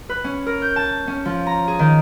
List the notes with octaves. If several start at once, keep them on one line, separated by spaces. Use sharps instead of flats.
B4
C#4
A#4
G6
A5
C#4
F3
A#5
G#4
D#3